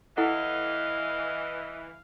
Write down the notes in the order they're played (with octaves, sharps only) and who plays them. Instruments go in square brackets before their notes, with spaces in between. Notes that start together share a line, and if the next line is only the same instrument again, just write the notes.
[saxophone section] E3 [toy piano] E4 A4 F#5 [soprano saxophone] D#5 [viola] F5